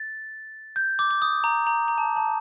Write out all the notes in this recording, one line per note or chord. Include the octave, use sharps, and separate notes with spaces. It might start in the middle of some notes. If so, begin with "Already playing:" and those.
Already playing: A6
G6
D6
D6
D#6
A#5
A#5
A#5
A5
A5